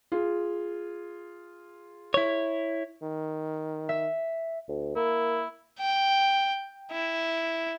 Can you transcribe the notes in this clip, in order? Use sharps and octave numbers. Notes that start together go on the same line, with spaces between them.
F4 G#4
E4 C#5
D#3
E5
D2
A#3 E4
G5
E4